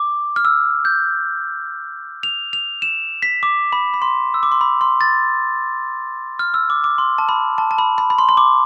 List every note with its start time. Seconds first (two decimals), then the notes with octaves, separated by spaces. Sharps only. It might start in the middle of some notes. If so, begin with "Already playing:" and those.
Already playing: D6
0.36 F6
0.45 E6
0.85 G6
2.23 F7
2.53 F7
2.82 E7
3.22 B6
3.43 D6
3.73 B5
3.94 B5
4.02 C6
4.34 E6
4.43 D6
4.52 C6
4.61 B5
4.81 C6
5.01 A6
6.39 F6
6.54 E6
6.70 D6
6.84 D6
6.98 C6
7.18 A5
7.29 B5
7.58 A5
7.71 A5
7.78 B5
7.98 B5
8.10 B5
8.18 C6
8.29 C6
8.37 D6